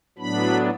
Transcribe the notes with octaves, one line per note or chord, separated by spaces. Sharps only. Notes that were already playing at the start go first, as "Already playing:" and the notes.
A2 F#3 B3 D4 B5